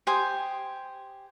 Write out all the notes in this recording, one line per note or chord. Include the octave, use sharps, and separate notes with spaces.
G4 C5 G#5 D#6